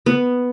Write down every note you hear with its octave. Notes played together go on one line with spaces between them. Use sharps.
B3